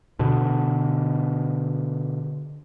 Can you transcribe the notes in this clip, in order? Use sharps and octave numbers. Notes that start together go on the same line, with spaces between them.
B2 D3